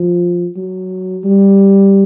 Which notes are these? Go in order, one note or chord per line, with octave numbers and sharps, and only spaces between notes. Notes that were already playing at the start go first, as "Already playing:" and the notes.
Already playing: F3
F#3
G3